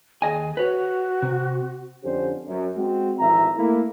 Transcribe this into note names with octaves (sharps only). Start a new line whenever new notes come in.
D#2 G#4 D#5 G#5
F#4 B4 C#5
C3
F2 D3 C#4 D4 G4 C5
F#2
G#3 C4 F#4
G#1 F2 E3 E5 A#5
A3 A#3 E4